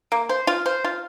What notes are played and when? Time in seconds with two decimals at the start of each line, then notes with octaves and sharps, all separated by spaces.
0.12 A#3
0.29 C5
0.47 F4
0.66 C5
0.84 F4